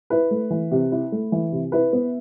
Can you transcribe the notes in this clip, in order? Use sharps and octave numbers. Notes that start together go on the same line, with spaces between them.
E4 B4
A3
E3
C3
E4
A3
E3
C3
E4 B4
B3